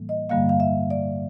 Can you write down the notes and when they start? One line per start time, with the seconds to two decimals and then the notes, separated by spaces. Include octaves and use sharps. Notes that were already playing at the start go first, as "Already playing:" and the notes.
Already playing: A2 E3 G3 A#3
0.09 D#5
0.29 G2 D3 G3 A#3 F5
0.49 F5
0.60 E5
0.90 D5